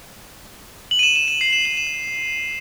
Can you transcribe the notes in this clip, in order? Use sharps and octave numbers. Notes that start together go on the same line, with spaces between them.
F#7
D#7
E7
E7
D#7
C7
E7
F#7
E7